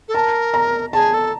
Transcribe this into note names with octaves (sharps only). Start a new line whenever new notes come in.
A4
A#4 A5
A#5
G#4 A5
A4